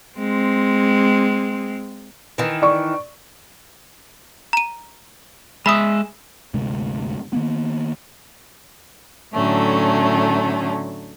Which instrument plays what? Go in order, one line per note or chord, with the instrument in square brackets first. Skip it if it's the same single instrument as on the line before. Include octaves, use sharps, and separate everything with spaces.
[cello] G#3 C4
[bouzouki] D#3 E3
[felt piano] D5 C#6
[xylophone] A#5 D#7
[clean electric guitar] G#3 E5 [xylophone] B5 D#6
[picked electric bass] G1 D2 C3 G#3
D#3 A#3 B3
[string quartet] A2 D3 F#3 A3 C#4